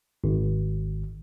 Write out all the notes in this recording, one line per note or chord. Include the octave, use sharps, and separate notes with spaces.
G#1